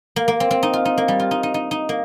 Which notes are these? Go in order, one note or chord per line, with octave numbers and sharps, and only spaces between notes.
A#3
A#3
C4
C4
D#4
F4
D#4
A#3
G3
F4
D#4
D#4
D#4
D#4
A#3